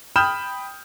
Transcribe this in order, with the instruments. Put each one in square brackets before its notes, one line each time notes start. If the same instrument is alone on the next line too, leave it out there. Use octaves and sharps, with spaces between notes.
[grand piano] G5 B5 D#6 F6 G6 E7